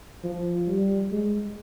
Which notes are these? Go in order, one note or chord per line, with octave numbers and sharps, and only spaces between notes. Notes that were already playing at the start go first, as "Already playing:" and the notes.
F3
G3
G#3